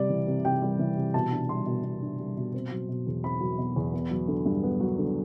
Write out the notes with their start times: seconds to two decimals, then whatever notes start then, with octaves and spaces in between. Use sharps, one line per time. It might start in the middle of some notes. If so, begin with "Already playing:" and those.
Already playing: C3 G3 D5
0.10 E3
0.27 C3
0.45 C3 G5
0.62 G3
0.79 E3
0.97 C3
1.14 B2 A5
1.32 D4
1.49 G3 C6
1.66 B2
1.84 B2
2.02 D4
2.19 G3
2.37 B2
2.54 C4
2.72 F#3
2.89 B2
3.07 E2
3.23 C4 B5
3.41 F#3
3.58 B2
3.76 E2
3.93 B3
4.11 F#3
4.28 D3
4.46 G2
4.64 B3
4.80 F#3
4.98 D3